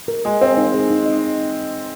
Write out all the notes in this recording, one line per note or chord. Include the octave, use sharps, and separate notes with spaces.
A#4
G#3 G#5
C4 F5
D#4
G#4
D#4
D#5